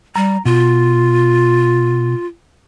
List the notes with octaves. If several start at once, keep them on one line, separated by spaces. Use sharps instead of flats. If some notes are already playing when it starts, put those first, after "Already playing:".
G3 A#5
B2 F4